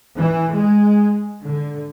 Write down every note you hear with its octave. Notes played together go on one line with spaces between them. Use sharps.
E3
G#3
D3